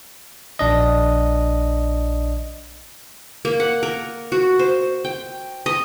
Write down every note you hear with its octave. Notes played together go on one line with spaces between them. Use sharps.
A#1 D4 D#5
A#3
F#5
A#4
F#4
C5
G5
D#5